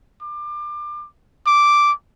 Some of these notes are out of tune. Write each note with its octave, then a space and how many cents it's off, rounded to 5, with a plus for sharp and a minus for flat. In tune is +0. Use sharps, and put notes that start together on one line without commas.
D6 +25
D6 -5